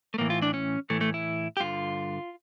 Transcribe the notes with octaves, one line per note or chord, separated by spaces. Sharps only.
A3
A2 E3 A#3
F4
D4
C#4
A2 E3 A3
A3
E4
G4
G2 D3 F4